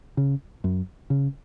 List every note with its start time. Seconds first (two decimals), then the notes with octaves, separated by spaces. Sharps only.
0.17 C#3
0.64 F#2
1.10 C#3